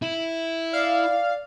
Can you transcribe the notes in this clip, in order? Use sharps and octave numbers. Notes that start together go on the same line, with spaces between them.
E4
D5 F5